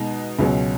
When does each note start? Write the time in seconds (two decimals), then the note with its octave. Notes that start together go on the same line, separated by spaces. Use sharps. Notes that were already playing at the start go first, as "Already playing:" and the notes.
Already playing: B2 G#3 D#4
0.39 C#2 B2 F#3 C#4